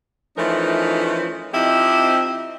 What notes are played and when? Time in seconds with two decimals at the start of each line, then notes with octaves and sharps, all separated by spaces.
0.37 E3 F3 A3 C#4 D#4 A#4
1.54 F3 C4 D#4 E4 G4 D#5